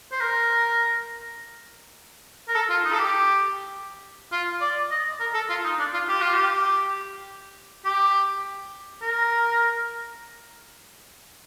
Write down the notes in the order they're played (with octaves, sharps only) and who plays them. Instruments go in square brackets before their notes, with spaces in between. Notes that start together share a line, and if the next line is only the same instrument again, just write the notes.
[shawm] C5
A#4
A#4
A4
F4
D#4
A4
G4
F4
D5
D#5
A#4
A4
F4
D#4
D4
F4
G4
F4
G4
G4
A#4